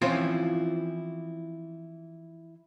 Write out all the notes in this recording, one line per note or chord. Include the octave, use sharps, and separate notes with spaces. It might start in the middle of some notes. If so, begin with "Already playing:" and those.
E3 F3 C4 C#4 E4 F4